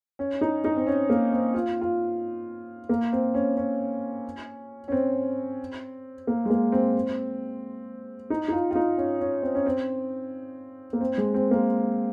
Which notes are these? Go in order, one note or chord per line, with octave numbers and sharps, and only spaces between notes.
C#4
D#4
D#4
C4
C#4
A#3
C4
F4
F4
A#3
C4
C#4
C#4
C#4
C4
A#3
G#3
A#3
C4
D#4
D#4
F4
F4
D#4
C#4
C#4
C4
C#4
C4
A#3
C4
G#3
C4
A#3